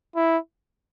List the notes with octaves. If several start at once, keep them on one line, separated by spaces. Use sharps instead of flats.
E4